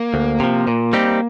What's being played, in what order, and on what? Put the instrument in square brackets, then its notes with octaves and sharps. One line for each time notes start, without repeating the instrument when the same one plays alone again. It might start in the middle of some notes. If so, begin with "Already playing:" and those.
Already playing: [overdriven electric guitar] A#3
[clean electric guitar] D2
C3 F3
A#2
G3 C4 D#4 G4